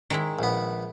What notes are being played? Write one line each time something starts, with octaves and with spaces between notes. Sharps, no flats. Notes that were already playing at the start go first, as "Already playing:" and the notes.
D#3 G#3 E4
A#1 B3